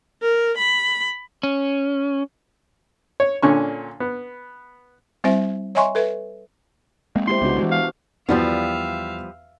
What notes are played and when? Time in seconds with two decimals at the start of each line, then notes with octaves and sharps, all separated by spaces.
0.22 A#4
0.57 B5
1.43 C#4
3.20 C#5
3.42 A#2 D3 C#4 C#6
4.00 B3
5.24 G3 C4 E4 C5 E5
5.75 C#5 D#5 E5 G#5 C6 C#6
5.95 A4 B4 E5
7.16 G#3 A#3 C4
7.27 E4 G4 C5 C6
7.41 C2 C#3 G#3 B3 D4 F#4
7.58 E3 G#3 F#4
7.71 F5
8.29 E2 E3 F3 G3 B3 F#4 E5 F5